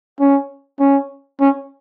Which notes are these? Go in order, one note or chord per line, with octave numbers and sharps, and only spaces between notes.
C#4
C#4
C#4